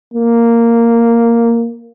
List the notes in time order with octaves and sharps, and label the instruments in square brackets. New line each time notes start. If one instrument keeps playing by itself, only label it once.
[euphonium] A#3